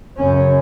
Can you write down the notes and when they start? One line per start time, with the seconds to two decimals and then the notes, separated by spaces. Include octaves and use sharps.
0.17 F#2 C#3 C#4